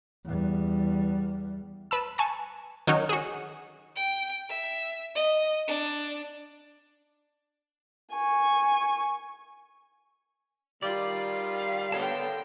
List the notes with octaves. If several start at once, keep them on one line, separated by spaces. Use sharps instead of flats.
E2 G3
B4 A5 E6
G#5 A5 C#6 F#6 A6
D#3 F#3 C#4 D#4 F#4 C#5
F#4 G#4
G5
E5
D#5
D4
G#5 C#6
D#3 G3 F4 D5 F5
D3 B3 A#4 C#5 G5 A5